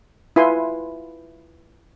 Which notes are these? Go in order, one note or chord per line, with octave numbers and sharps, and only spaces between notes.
E4 F4 B4 G#5 C6